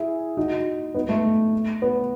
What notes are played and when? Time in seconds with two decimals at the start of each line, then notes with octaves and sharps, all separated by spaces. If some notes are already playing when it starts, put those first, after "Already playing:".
Already playing: E4 G#4
0.37 D#4 F#4
0.95 B3 D#4
1.09 A3
1.82 B3